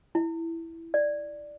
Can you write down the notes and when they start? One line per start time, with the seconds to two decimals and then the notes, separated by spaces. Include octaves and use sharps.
0.15 E4
0.94 D5